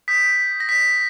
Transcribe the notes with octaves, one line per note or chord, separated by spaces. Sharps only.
D#6 G6 B6
A#6
B6